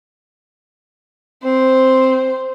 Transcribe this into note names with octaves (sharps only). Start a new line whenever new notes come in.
C4 C5